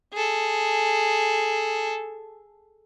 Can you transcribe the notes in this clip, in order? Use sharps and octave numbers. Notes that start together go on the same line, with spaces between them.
G#4 A4